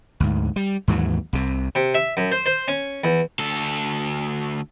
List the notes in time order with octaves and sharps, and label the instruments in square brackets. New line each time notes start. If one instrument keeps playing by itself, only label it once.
[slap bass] D2 G#2
G3
D#2 G#2 E3 F#3
C2 C3
[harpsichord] C3
E5
F#2
C5
C5
C#4
E2
[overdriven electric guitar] D2 A4